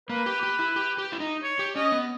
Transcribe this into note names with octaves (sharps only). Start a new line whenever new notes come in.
A#3 B4
G4
G4
E4
G4
G4
E4
D#4
C#5
G4
C#4 D#5
B3